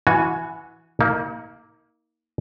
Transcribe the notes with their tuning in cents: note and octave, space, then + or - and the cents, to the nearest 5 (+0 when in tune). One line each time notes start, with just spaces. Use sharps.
E3 +0 F#4 -15 G#5 +15
A#3 +0 D#4 +40